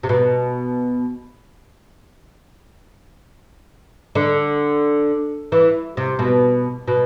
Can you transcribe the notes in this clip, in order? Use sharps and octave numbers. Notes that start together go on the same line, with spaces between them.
C3
B2
D3
E3
C3
B2
B2